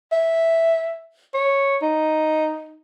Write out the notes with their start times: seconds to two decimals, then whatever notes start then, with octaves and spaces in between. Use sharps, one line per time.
0.12 E5
1.34 C#5
1.82 D#4